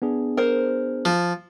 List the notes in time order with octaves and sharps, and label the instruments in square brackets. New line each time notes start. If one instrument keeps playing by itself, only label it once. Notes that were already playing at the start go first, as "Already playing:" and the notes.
[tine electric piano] B3 D4 G#4
[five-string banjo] A#4 C5
[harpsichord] F3